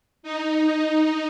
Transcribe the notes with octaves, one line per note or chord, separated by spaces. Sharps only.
D#4